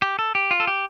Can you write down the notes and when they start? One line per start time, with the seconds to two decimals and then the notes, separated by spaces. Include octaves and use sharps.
0.02 G4
0.19 A4
0.35 G4
0.51 F4
0.60 A4
0.67 G4